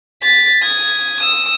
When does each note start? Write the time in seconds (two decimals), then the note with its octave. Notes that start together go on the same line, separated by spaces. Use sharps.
0.23 A6 B6
0.63 D#6 G#6
1.21 D#6 E6